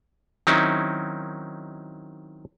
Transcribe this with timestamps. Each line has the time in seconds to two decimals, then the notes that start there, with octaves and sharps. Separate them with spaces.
0.47 D#3 F#3 C4 C#4 D#4 E4